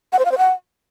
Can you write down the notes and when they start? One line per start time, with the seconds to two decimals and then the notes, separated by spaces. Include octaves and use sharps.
0.12 F#5
0.19 C5
0.25 F5
0.31 C5
0.38 F#5